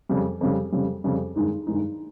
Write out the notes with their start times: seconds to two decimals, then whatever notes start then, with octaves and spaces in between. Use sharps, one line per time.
0.09 F2 C#3 G3
0.41 F2 C#3 G3
0.72 F2 C#3 G3
1.04 F2 C#3 G3
1.36 G2 D#3 G#3 D#4
1.67 G2 D#3 G#3 D#4